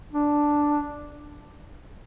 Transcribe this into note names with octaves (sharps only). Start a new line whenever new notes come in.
D4